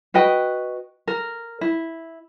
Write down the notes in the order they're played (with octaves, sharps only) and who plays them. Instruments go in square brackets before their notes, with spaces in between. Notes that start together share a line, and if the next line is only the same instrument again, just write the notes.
[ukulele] F#4 B4 D#5 G5
A#4
E4